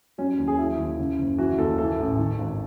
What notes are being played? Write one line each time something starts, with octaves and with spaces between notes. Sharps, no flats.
F#3 C#4
D#2
G#4
F#3 E4
D#2
C#3
F#1
E3 F#4
D#2 A4
E3 A4
A1
D#3
G#1